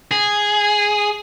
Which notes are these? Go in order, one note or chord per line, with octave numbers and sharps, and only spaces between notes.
G#4